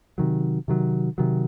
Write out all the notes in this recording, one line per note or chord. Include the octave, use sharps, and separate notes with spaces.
C3 D#3 F#3
C3 D#3 F#3
C3 D#3 F#3